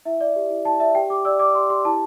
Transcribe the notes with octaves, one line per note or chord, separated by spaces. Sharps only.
E4 E5
D5
G4
E4
E4 A5
D5 E5
G4 G5
G4 D6
D5 E6
D5 D6
G4 C6
G4 C6
E4 A5